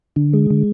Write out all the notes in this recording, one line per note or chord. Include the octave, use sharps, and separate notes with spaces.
D3
G#3
D3